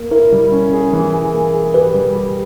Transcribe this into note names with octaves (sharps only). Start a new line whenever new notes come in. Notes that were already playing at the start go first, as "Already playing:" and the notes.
Already playing: A#3
E4 A#4
G3
C#4
G#4
E3
G#4
A#3
G#4
G4 B4
G3
G4